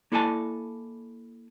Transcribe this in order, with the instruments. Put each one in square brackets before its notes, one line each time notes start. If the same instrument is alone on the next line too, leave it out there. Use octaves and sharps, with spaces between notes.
[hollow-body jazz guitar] A#3 E4 A4 D5 G#5 A5